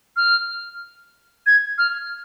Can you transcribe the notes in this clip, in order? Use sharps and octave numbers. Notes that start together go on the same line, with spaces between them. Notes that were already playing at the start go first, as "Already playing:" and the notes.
F6
G#6
F6